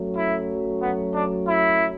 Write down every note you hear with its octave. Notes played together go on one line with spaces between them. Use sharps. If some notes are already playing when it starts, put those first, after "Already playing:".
Already playing: F#2 F#3 A3
E4
B3
D4
E4